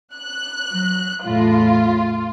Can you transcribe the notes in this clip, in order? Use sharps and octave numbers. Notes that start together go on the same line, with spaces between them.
F#6
F#3
E2 A2 C#3 F4